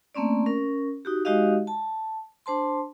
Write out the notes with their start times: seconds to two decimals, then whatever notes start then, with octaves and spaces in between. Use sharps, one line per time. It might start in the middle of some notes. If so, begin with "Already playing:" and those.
0.15 A3 A#3 C4 C#4 D5
0.46 C#4 A#4
1.05 D#4 F#4 G4
1.25 G#3 D#4 F#4 G4 D#5 F5
1.67 A5
2.46 D4 C5 A5 C6